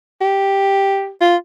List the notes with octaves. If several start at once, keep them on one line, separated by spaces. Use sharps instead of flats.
G4
F4